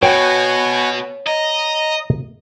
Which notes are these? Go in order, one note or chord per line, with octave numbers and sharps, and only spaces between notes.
B2 F#4 C#5 G5 G#5 C#6
D#5 A#5